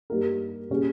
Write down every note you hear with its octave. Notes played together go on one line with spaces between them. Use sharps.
G2 G3 A#3 D#4 A#4
A#2 G3 C#4 G#4